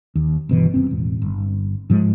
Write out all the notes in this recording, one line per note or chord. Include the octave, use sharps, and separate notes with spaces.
D#2
G1 B2 E3
F#1 F#2 C4
E1 A1
G1
G#2 F3 G3 G#3